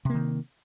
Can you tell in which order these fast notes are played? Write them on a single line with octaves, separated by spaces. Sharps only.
C3 A#3 D#3